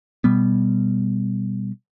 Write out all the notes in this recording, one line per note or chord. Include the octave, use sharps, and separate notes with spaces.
B2 G3 B3